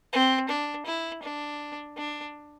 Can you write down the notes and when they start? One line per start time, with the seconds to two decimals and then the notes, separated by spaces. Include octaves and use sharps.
0.13 C4
0.49 D4
0.86 E4
1.23 D4
1.97 D4